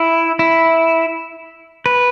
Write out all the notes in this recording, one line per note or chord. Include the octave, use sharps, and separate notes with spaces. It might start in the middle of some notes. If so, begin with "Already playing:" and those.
Already playing: E4
E4
B4